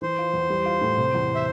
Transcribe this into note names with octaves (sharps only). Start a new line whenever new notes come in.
E3 C5
F4
E2
G3
F4
A2
C3
E2
E5